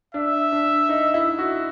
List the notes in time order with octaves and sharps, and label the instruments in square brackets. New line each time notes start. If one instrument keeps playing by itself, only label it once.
[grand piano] D4 [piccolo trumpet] E5
[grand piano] D4
D#4
E4
F#4